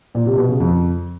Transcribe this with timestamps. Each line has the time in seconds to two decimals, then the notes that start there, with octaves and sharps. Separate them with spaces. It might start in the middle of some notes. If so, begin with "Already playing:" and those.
0.15 A#2
0.26 C3
0.37 B2
0.49 C#3
0.60 F2